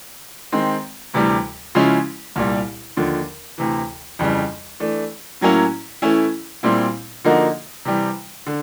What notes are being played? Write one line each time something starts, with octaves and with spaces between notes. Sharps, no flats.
D#3 G#3 C4
D2 C3 E3 G3
C#3 F3 G#3 C#4 E4
C2 A#2 G3
D#2 D3 F3
D2 C3 E3
F2 C#3 E3 G3
E3 A3 D4
A2 F#3 A#3 C#4 E4
E3 A3 C#4 E4
A#2 G3 C4 E4
D3 F3 A#3 D#4 F#4
C3 E3 G3
D3